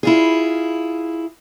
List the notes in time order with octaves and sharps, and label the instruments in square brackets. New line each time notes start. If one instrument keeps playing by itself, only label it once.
[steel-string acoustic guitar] E4 F4 G#4